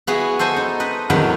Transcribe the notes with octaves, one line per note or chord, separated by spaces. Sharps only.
B3 E4 F#4 G#4
A4 C5 D#5 G#5
D#4
B4 D#5
E2 A2 D#3 F#3 C4 B4